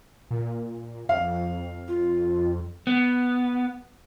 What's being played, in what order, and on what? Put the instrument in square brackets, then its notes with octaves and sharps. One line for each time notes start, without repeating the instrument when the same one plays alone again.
[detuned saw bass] A#2
[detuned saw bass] F2 [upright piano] F5
[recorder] F4
[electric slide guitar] B3